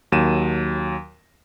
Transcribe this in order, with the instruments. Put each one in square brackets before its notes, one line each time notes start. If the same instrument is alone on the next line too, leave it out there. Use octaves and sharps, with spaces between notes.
[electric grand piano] D#2 F#3 D#7 E7